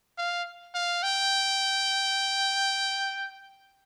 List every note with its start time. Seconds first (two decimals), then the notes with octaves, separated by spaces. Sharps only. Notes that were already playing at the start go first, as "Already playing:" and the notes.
0.18 F5
0.74 F5
1.03 G5